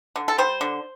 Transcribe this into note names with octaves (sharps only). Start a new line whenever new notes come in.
D3
A4
G3 C5
D3